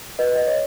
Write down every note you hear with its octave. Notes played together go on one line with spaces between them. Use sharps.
B4 D#5
D#5
C#5